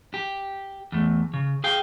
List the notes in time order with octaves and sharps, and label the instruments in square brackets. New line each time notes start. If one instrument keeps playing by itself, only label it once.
[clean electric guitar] G4
E2 A3
C#3
G#4 F5 G5